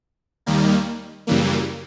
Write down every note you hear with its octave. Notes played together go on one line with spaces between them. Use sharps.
D#2 D#3 G3 A#3
F#2 C#3 E3 G3 A#3